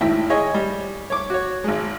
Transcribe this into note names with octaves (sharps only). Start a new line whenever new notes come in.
G#1 A2 D#3 E4 G5
G#4 C#5 D#5
G3
C#5 D6
F#4 C#5
G#1 G#3